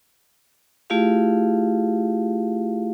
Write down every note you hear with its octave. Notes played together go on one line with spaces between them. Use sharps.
A3 E4 F4 G4 G#4 F5